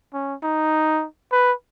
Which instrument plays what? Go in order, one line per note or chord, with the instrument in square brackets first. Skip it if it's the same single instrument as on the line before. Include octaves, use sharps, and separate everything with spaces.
[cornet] C#4
D#4
B4